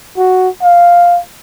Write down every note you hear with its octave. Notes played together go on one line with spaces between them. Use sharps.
F#4
F5